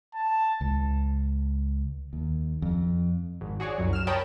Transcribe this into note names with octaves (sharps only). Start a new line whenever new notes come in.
A5
C#2
D#2
F2
G#1
F#4 G#4 C#5 D5
C2 F#2 F#3
F6 E7
A#4 C#5 G5 A5 B5 D#6